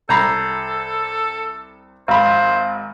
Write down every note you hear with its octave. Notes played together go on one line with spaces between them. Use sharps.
C2 A4 A#5 B5 G6 G#6 C7
G#1 C5 F5 F#5 B5 C6